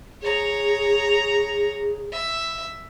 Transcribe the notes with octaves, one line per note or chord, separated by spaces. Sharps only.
G#4 C#5 A#5
E5